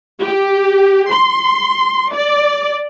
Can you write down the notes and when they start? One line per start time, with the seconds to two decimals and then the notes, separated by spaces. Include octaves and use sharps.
0.22 G4
1.11 C6
2.13 D5